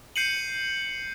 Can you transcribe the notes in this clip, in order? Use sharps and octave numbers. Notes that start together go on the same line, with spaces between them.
G6 C7 C#7 D#7 F#7